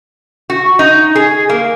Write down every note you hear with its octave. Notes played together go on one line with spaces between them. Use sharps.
F#4
D#4
G#4
A#3